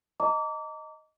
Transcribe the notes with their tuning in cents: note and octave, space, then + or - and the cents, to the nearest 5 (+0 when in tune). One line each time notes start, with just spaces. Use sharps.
D#5 +0 A#5 -30 D6 -30